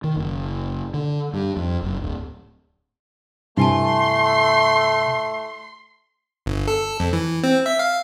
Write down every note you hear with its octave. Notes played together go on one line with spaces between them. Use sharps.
D#3
F#1
D3
G2
F2
F#1
D1
G2 C3 A3 E4 G#5 A5 C6
G1
A4
F2
E3
C4
E5
F5